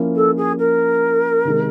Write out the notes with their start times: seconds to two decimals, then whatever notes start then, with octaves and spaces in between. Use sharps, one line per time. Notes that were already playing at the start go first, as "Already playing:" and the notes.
Already playing: F3 A#3 C#4 E4
0.15 A4
0.37 G#4
0.58 A#4
1.45 C3 D#3 G#3